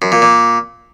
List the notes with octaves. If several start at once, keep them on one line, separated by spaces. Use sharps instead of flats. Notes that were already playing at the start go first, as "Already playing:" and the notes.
F#2
A#2
A#2